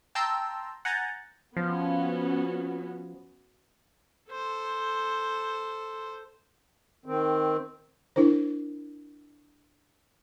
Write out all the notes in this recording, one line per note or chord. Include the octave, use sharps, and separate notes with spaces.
G5 A5 A#5 C6 E6 G6
F#5 G#5 A#5 F#6 G6 A6
F3 B3 C#4 F#4
A4 C5
D#3 C4
D4 E4 A#4 C5